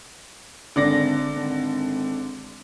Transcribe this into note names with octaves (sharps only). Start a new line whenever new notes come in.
G#1 D3 D5 A#6
G#1